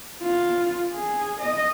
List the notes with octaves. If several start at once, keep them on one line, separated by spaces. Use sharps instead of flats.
F4
G#4
D#5